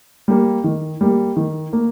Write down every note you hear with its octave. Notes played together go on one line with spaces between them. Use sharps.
G3 A#3
D#3
G3 A#3
D#3
A#3